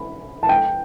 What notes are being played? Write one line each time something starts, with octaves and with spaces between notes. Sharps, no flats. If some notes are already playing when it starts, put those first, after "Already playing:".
Already playing: B5
A5
G5